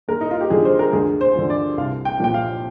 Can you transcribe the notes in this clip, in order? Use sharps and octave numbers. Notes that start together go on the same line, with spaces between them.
D#2 A#4
D#4
F4
G4
D3 F3 G#4
C5
A#4
D2 G#4
C5
D3 F3
D5
C2 F5
G5
A#2 F3 G5
F5